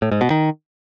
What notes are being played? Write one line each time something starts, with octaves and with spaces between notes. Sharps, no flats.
A2
G#2
B2
D#3